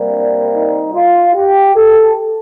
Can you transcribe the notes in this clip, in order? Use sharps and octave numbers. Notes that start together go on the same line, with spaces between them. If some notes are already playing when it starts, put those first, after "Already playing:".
Already playing: C3 G3 A#3
D4
D#4
F4
G4
A4